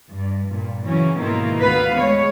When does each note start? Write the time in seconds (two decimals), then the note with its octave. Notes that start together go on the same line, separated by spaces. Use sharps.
0.10 G2
0.51 G2 A#2
0.85 C#3 E3 F#3 C#4
1.18 G#2 B2 D#3 A#3 E4 F4
1.60 D2 B3 B4 F5
1.98 G#3 C#5